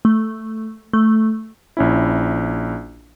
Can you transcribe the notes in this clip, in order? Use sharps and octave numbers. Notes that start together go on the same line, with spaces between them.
A3
A3
A#1 C#4 E4